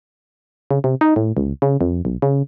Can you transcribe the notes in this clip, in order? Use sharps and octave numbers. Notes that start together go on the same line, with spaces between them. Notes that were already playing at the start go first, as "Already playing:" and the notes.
C#3
C3
D#4
A2
C#2
C#3
F2
B1
C#3